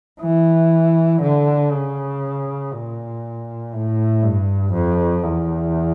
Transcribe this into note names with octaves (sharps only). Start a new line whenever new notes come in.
E3
D3
C#3
A#2
A2
G2
F2
E2